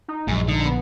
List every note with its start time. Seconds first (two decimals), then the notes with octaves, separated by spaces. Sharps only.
0.08 D#4
0.28 A#1 F#2 G#3
0.48 D3 D#4
0.65 B3